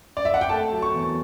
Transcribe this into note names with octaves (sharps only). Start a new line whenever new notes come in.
D5
E5
F#5
G5
A3 A5
F#3
C#6
E2